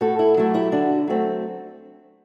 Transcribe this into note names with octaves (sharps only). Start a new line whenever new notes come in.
A2 F#4 A4
E4
F#3 A3 E4
E4 G4
D3 D4 F#4
F#3 A3 C4